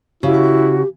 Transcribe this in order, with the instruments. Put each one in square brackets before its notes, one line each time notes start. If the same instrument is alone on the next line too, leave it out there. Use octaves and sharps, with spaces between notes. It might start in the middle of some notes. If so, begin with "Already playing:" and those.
[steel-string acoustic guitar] C#3 [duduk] E4 [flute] F#4 [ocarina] G4